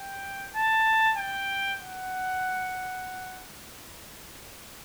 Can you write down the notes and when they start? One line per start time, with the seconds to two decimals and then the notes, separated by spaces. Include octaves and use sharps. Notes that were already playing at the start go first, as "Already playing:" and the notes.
Already playing: G5
0.56 A5
1.18 G5
1.81 F#5